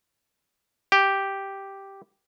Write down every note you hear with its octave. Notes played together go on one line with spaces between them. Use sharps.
G4